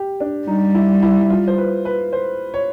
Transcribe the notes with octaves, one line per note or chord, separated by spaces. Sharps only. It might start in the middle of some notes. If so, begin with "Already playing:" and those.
Already playing: G4
D4
G3 D#4
E4
E4
E4
F4
C5
B4
B4
C5
C#5